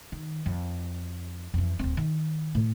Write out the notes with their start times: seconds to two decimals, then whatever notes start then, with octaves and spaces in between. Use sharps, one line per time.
0.12 D#3
0.46 F2
1.54 F2 E3
1.79 D1 C4
1.97 D#3
2.55 A2